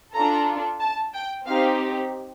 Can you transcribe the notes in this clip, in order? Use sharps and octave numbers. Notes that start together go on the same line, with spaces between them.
D4 F4 A4 A#5
A5
G5
C4 D#4 G4 F5